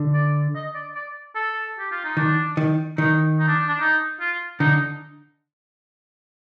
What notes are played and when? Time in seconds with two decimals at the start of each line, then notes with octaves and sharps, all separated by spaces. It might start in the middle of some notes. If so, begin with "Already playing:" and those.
Already playing: D3
0.14 D5
0.55 D#5
0.74 D5
0.95 D5
1.35 A4
1.79 G4
1.91 F4
2.04 D#4
2.17 D#3 D4
2.57 D#3
2.97 D#3 D#4
3.39 D#4
3.47 D4
3.68 D4
3.80 D#4
4.20 F4
4.60 D3 D#4